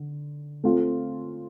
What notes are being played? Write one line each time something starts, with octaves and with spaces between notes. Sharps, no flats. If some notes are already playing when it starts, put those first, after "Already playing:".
Already playing: D3
A3 C4 F4